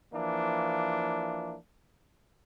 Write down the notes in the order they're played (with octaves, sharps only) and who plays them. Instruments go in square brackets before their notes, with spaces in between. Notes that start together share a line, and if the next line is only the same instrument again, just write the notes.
[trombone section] E3 F3 A#3 D4